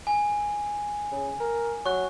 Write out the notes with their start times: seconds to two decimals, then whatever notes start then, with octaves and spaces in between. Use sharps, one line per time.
0.07 G#5
1.12 C#3
1.40 A#4
1.86 F#3 C#6 F#6